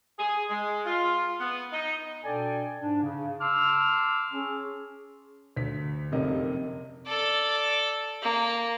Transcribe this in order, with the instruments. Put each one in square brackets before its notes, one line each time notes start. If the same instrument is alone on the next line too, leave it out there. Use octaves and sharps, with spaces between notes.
[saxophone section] G#4
G#3
F4
B3
D#4
[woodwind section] B2 D4 A4 D5 G5 G#5
G#2 D4
C#3
A5 C6 D6 E6 F6
C#4 G#4
[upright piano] D2 B6
F1 F#2 C3 A#3 D#5
[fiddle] A4 D5
A#3